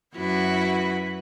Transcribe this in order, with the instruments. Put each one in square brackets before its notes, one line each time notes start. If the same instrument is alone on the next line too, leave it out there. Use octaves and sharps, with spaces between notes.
[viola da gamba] F#2 B4 [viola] E4 F#4